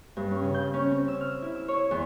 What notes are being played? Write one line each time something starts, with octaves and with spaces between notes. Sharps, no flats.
G2
C#4
C#3
G6
C#4
C4
E6
F6
E4
E6
C#5
E2